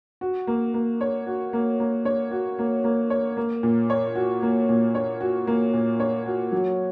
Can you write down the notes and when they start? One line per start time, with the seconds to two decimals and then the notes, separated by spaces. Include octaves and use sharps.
0.21 F#4
0.47 A#3
0.74 A#3
1.01 C#5
1.27 F#4
1.53 A#3
1.80 A#3
2.05 C#5
2.31 F#4
2.59 A#3
2.84 A#3
3.10 C#5
3.37 A#3
3.63 A#2
3.90 C#5
4.15 F#4
4.42 A#3
4.69 A#2
4.95 C#5
5.21 F#4
5.47 A#3
5.73 A#2
6.00 C#5
6.26 F#4
6.52 F#3